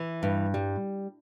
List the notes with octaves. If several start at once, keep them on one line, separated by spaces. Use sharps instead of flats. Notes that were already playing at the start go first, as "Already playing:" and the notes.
Already playing: E3
G2
G3